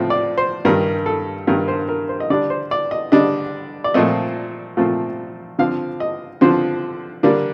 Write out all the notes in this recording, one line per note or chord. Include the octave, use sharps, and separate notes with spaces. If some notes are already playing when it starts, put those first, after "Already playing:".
Already playing: A2 F3 C4
D5
C5
G2 D#3 G3 A#4
A4
G2 D#3 G3 A#4
C5
A#4
C5
D#5
D3 G3 D4 D5
C5
D5
D#5
D3 G3 D4 D#5
D5
A#2 F3 A3 C4 D#5
A#2 F3 A3 C4
D3 F3 C4 F5
D#5
D3 F3 C4 C5
D3 G3 A#3 D4